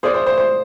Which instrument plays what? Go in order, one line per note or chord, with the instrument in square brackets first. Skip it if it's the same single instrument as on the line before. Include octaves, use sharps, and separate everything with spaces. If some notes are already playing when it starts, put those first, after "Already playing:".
[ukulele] F4 G#4 D5 [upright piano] C5
[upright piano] C5
C5
C5